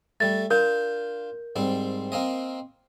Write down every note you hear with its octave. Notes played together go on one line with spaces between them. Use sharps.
G3 A3 A6
D4 F4 A#4 G6
G#2 G3 C4
A#3 C4 D#5